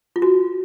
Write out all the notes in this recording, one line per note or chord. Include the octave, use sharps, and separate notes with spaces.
F4
F#4